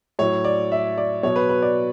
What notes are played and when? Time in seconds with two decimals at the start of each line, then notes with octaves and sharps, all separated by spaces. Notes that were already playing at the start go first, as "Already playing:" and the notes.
0.19 A2 F#3 C#5
0.44 D5
0.72 E5
0.98 D5
1.23 B2 F#3 C#5
1.36 B4
1.49 B4
1.62 D5